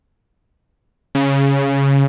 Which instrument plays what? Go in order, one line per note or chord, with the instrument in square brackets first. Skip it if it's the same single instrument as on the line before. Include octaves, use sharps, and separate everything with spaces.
[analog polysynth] C#3